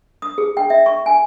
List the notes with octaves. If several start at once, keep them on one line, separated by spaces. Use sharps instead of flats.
D#6
G#4
G5
E5
C#6
G#5